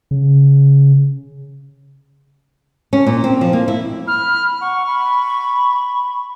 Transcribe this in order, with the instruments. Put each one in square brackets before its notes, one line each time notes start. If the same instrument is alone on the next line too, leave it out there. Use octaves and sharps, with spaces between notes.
[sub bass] C#3
[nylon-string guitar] C#4
A#2
C4
F3
A#3
E4
[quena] B5 [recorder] F6
[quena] F#5 [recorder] C#6
[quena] B5